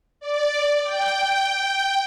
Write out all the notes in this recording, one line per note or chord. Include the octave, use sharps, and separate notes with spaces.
D5
G5